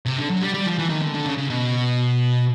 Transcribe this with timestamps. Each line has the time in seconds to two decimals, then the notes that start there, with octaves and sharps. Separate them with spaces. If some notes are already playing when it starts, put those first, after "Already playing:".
0.05 C3
0.18 D3
0.29 F#3
0.42 G3
0.54 G3
0.66 F3
0.78 E3
0.89 D#3
1.01 D3
1.14 D3
1.25 C#3
1.38 C#3
1.50 B2